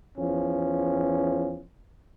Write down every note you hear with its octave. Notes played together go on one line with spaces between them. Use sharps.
E2 F3 C#4